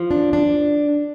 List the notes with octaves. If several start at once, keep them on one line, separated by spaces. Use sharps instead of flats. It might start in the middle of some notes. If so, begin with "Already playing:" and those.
Already playing: F3
D4
D4